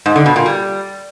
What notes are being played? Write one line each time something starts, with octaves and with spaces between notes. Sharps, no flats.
G#2
D3
B2
A#2
G3